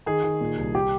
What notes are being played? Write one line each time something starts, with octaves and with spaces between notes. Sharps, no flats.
D#3 G#4
D#3
A#2
C2
G4